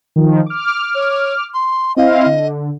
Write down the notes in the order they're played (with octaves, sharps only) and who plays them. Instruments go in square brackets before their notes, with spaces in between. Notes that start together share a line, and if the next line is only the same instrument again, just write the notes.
[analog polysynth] D#3 F3
D6 F6
[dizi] C#5
C6
[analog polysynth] C4 E4 F5 [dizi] D#5
[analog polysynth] D3